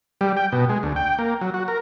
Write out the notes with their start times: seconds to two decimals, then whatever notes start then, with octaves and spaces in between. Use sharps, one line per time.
0.21 G3
0.37 G5
0.52 B2
0.69 G#3
0.83 D2
0.96 G5
1.19 A#3
1.41 F#3
1.54 F#4
1.68 A#4